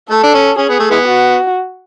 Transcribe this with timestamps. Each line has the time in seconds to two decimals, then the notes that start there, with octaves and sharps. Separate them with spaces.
0.10 A3 A4
0.23 D4
0.34 C#4
0.58 C#4 G#4
0.69 B3
0.79 A3
0.91 E3 G#3 B3
1.07 F#4